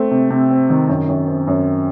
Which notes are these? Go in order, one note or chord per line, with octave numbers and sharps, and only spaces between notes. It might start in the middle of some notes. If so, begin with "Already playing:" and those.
Already playing: A3 C4
C3
C3
C4
D#3
F#2
F#2
C4
F#2